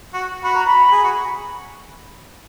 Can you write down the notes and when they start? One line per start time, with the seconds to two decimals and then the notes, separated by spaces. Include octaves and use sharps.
0.14 F#4
0.43 F#4 B5
0.55 A#5
0.67 B5
0.92 G#4
1.04 F#4